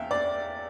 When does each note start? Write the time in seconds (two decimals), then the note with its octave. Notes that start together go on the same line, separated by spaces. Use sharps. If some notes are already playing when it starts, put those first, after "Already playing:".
Already playing: E2 E5 F5 G5
0.11 D5